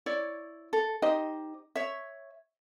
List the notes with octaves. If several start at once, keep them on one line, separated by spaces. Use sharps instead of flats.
E4 C#5 D5
A4
D#4 G4 C5 D#5
C#5 E5